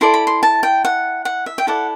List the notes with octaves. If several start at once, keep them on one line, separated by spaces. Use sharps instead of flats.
E4 A4 D5 C6
B5
C6
A5
G5
F#5
F#5
E5
G5
E4 A4 D5 F#5